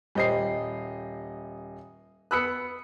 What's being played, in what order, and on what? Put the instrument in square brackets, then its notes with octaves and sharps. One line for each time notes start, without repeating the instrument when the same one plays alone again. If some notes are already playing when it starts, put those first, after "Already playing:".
[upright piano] D#1 D#5 C7 [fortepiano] G3 C5
[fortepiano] B3 B5 F#6 [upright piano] D#6 E6 C#7